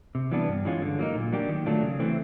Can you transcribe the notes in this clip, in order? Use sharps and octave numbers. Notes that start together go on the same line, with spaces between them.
C3
E3 G3 B3 D4
G2
E3 G#3 C#4 F4
D3
F#3 A#3 D#4
A#2
F#3 A#3 D4 G4
D#3
F#3 A3 D4 F4
C#3
E3 A3 C4